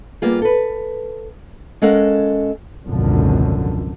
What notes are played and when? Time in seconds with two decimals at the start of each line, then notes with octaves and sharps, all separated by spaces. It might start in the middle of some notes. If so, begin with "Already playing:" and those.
0.22 G3 A#3 B3 F4 G#4
0.42 A4 B4
1.82 G#3 C#4 A4 A#4 F5 F#5
2.87 G#1 C#2 F#2 B2 D3 F3